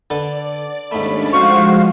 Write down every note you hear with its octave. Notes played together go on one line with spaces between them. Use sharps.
D3 A4 B4 D5
D#2 G#2 A3 C#4 D4 D5 B5
F3 G#3 F#4 C5 F5 C#6